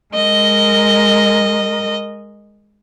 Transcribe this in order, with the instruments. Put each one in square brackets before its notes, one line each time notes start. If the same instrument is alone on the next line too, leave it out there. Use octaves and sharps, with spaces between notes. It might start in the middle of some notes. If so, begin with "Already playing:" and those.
[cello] G#3 A#4 [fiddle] D#5